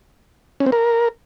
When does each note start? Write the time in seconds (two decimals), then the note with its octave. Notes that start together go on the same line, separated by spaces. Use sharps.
0.60 C#4
0.66 C4
0.72 A#4